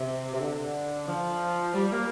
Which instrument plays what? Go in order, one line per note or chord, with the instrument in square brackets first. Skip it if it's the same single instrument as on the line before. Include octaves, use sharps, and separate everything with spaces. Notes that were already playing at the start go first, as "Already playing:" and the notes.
Already playing: [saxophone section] C3
C3
D3
F3
G3
A#3